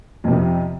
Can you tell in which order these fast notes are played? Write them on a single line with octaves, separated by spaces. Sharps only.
F2 C3 F3